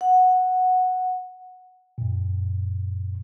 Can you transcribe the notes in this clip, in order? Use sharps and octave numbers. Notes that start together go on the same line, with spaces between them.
F#5
F#2 A#2